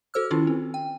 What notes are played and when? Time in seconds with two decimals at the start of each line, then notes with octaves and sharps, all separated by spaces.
0.14 F#4 A4 C5 E6 F6
0.31 D#3 C#4 E4 F4
0.47 C4
0.74 G5